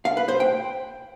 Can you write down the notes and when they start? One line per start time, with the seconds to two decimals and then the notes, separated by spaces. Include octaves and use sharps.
0.05 F5
0.17 B4
0.28 C5
0.40 G5